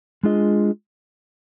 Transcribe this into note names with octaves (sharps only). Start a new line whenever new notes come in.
G#3 D4 F4 G#4 D#5